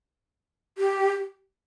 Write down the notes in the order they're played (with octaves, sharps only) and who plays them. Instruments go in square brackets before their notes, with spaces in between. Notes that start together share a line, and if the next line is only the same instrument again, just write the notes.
[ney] G4